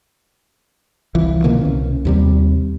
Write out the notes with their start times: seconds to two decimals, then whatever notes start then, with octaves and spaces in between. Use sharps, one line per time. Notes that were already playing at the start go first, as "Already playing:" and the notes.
1.15 C2 E3 F3
1.44 B2 D3 D#3 A#3
1.61 C2 C#4
2.05 D#2 C3 G3